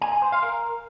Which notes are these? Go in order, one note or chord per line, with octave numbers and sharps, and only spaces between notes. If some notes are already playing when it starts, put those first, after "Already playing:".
G#5
G#5
C5
F5
A#4